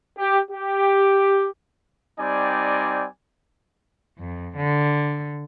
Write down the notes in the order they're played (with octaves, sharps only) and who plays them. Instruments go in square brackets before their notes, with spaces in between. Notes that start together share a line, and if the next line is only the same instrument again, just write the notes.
[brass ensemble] G4
G4
[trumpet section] G3 C4 D#4 D5 G#5
[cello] F2
D3